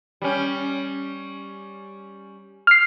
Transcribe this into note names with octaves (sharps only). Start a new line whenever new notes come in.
G3 C#4
F6 C7